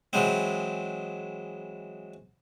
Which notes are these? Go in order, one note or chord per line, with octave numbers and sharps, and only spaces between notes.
E3 F#3 G#3 C4